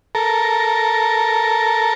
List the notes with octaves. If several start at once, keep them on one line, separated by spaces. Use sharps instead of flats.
A4 A#4